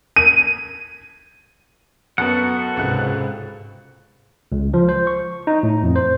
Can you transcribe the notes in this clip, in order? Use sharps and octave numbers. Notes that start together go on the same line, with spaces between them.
D#7
F#2 B3 F#4 A4 F#5
C#2 G#2 C3 F#6
C#2
F3
C5
C#6
D#4
A2
F2
C5